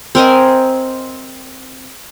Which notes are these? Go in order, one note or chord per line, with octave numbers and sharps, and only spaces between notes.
C4 A#4 D#5 G#5